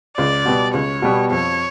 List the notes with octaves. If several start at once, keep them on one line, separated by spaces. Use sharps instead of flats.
C#2 D5
B2 G3 B3
C#2 C#5
B2 G3 B3
F2 C#5